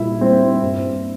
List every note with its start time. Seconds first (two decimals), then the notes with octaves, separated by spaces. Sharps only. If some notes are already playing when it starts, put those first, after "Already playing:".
Already playing: A#2 G3 E4 E5
0.21 G3 C4 C5
0.62 G2